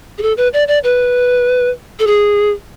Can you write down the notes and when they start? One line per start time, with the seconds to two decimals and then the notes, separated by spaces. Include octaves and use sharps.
0.18 G#4
0.22 A4
0.37 B4
0.53 D5
0.68 D5
0.84 B4
1.99 A4
2.07 G#4